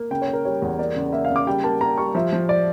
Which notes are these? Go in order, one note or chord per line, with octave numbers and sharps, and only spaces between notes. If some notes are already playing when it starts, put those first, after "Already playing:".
Already playing: A#3
C#3 G5
C#5
A#3
A#4
G3 C#5
E2
A#3 D5
C#3
A#3 E5
F5
C#3
D6
G3 G5
A#3 A5
A#3 A#5
G3 C#6
F3 E5
F3
D5